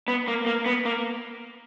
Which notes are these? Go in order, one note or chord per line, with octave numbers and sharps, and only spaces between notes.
B3
A#3
A#3
B3
A#3